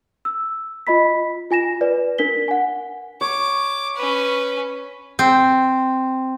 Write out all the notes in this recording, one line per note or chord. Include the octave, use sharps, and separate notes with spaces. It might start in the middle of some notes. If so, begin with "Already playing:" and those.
E6
F4 D#5 B5 B6
F4 G#5 A#6 E7
B4 D5
D4 A#4 B6 G7
F#5 G#5
C#5 D6
C#4 B4
C4